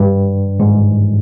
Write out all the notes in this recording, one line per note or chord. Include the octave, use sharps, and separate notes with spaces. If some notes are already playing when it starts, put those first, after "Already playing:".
Already playing: G2
G#2